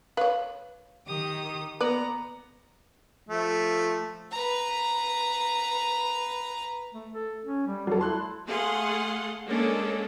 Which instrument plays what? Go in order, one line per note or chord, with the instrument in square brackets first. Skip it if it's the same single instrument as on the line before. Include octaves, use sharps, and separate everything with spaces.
[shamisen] B4 C#5 [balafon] F5
[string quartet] D#3 G4 D#6
[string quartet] B3 A#5 [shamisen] B4 D5
[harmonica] F3 A3
[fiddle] B4 A#5
[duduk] A3
A4
C#4
G3
[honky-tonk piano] F#3 A4 [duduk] G3
[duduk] E4 [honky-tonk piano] A5 C6 F#6
[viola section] A3 G#4 F5 F#5 C6
G#3 A#3 C#4 D4 G#4 A4